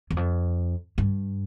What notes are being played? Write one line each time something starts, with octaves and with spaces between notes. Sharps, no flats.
E2
F2
G2